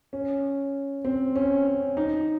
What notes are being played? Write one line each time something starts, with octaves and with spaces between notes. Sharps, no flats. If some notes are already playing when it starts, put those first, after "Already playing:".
C#4
C4
C#4
C#4
D#4